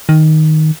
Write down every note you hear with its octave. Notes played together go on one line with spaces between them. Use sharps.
D#3